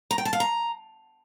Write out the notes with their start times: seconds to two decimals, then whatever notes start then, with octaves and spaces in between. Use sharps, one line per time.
0.11 A#5
0.18 G5
0.25 A5
0.33 F5
0.40 A#5